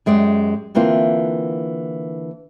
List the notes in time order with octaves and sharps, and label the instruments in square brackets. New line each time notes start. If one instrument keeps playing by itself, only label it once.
[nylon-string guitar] F#2 G#3 G4 D5
D3 E3 A#3 C4 F4